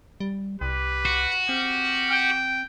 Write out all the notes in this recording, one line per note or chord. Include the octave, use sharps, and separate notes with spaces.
G3
C2 G4 B4
F#4
C4 G4 F6
G5